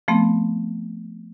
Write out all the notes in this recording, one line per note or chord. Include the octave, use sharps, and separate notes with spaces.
F3 A3 B3 C4